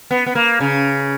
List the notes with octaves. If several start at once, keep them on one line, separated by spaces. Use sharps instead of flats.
B3
B3
A#3
C#3